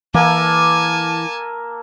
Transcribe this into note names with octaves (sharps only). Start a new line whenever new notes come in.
E3 A#3 A4 G#5 A5